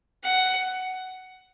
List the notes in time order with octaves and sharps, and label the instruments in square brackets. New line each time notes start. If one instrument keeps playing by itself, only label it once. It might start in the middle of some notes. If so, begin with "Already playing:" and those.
[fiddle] F#5